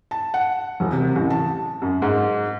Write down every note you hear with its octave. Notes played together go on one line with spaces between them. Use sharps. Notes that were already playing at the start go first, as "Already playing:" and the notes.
A5
F#5
E1
C3
A1
A5
F#2
G#2